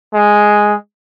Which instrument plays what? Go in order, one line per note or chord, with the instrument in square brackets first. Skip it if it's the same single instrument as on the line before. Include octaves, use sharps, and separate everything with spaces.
[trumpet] G#3